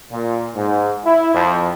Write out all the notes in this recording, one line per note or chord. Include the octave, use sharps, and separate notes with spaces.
A#2
G#2
E4
F2